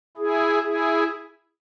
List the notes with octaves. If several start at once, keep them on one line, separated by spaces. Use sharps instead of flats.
E4 G#4
E4 G#4